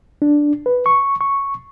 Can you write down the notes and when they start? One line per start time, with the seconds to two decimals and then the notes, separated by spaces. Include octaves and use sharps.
0.22 D4
0.66 B4
0.86 C#6
1.21 C#6